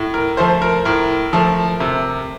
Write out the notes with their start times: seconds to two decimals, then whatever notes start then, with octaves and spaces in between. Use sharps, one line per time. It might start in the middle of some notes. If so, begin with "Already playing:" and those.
Already playing: A2
0.14 A#4
0.37 F3 A3 C5
0.62 A#4
0.85 A2 A#4
1.33 F3 A3
1.80 C3